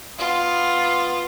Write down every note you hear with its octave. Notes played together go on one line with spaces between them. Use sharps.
B3 F4